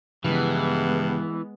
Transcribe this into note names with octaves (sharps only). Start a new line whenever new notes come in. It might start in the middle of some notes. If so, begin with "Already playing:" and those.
G2 C#3 E3 F3 G#3 B3